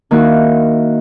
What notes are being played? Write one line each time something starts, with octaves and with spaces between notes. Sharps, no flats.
D#3 A#3 E4 F#4